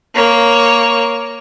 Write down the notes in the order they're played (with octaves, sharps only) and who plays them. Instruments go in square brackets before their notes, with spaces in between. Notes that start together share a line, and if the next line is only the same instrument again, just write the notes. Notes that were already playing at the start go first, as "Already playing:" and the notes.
[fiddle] A#3 C#5